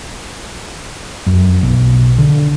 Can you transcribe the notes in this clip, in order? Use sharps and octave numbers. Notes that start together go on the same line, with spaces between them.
F#2
B1
D3